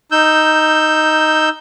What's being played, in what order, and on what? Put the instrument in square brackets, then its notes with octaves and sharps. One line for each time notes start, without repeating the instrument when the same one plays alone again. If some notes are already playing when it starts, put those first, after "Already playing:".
[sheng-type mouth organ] D#4 E6 G6